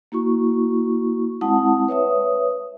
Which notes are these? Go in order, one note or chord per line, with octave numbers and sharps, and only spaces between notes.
A#3 E4 F#4 C#6
G#3 C4 E4 F#5 A5 D#6
B4 C#5 E5 D#6